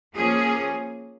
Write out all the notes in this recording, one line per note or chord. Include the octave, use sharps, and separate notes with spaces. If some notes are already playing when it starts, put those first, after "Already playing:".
F3 A#3 C#4 G#4